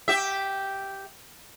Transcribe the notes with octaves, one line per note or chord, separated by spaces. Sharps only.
G4 E5